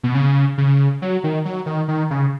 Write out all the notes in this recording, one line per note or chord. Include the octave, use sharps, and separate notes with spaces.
B2
C#3
C#3
F#3
D#3
F#3
D#3
D#3
C#3